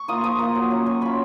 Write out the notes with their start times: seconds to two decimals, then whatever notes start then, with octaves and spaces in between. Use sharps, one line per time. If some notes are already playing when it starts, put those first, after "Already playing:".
Already playing: C#6
0.08 A#3 F4 D#6
0.23 F3 D#6
0.39 A#3 F4
0.55 F#3
0.71 C#4 F4
0.86 F#3 C#6
1.01 C#4 F4 B5